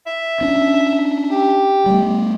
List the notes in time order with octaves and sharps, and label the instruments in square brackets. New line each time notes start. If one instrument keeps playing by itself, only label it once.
[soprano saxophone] E5
[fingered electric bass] C#4 D4
[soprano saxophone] G4
[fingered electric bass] G3 A3